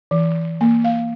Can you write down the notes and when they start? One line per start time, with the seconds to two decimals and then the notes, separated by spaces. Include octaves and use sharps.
0.11 E3
0.61 A#3
0.84 F5